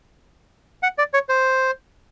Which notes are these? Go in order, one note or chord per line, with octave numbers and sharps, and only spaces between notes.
F#5
D5
C#5
C5